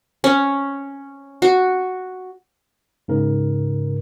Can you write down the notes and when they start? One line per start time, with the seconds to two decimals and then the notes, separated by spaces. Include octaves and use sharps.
0.24 C#4
1.42 F#4
3.08 G#2 C#3 A#4